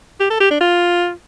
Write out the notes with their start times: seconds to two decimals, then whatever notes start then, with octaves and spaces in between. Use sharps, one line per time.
0.20 G4
0.30 A4
0.40 G4
0.50 D4
0.60 F4